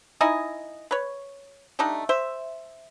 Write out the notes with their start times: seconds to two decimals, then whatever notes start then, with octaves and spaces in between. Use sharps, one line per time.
0.21 D#4 E4 D#5 G#5
0.91 B4 C#5
1.79 G3 A3 D4 D#4
2.09 C5 E5